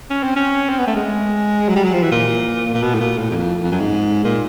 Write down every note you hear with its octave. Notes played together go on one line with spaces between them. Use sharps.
C#4
C4
C#4
C4
B3
A3
G#3
F#3
G3
F#3
F3
E3
A#2
A#2
B2
A2
A#2
A2
E2
F2
F2
F#2
G#2
A#2